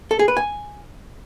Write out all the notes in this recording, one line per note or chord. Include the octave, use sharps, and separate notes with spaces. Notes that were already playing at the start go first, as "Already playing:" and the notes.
A4
G#4
B4
G#5